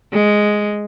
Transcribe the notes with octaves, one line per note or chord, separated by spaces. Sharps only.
G#3